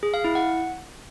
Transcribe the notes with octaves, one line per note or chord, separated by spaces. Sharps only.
G#4
F5
E4
F#5